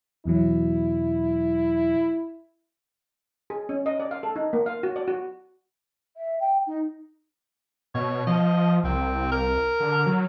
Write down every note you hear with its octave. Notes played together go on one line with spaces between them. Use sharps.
E2 B2 F#3 E4
G#4
C#4
D#5
D5
F5
A4
D#4
A#3
F5
F#4
D5
F#4
E5
G5
D#4
B2 C#5
F3 D#5
C2 C4
A#4
D3
F#3